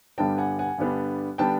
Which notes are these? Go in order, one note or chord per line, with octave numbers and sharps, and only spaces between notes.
G2 D3 G3 B3 D4 G5 A5
F#5 G#5
F#5 G#5
G2 D3 G3 B3 D4
D3 G3 B3 D4 G5 A5